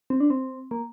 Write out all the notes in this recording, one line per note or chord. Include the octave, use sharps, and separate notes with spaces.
C4
D4
C4
A#3